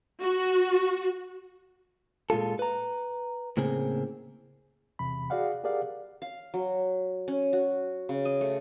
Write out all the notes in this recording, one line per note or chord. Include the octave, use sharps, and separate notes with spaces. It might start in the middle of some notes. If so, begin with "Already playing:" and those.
F#4
A#2 G#3 F4 A4
B4 A#5
A2 C#3 A#3 C4 G#4
E2 C3 B5
F#4 G#4 D5 F5 F#5
G4 G#4 A#4 D5 F5 F#5
F5
F#3
C#4
F#4
C#3
D#5
A3